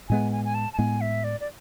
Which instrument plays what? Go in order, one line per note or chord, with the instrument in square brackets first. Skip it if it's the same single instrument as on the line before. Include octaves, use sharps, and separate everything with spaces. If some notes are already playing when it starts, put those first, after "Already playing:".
[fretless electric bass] A2 G#3 B3 [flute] G#5
[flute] G#5
G#5
A5
A5
[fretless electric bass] A2 G#3 B3 [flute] G#5
[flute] E5
D5
D5